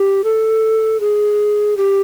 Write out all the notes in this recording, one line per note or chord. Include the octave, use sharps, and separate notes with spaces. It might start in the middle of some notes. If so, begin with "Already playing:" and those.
Already playing: G4
A4
G#4
G4